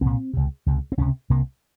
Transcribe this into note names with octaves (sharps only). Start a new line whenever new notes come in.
C2 A#2 C4
C#2 C3
C#2 C3
C4
C#2 C3 C#4
C2 C3 A#3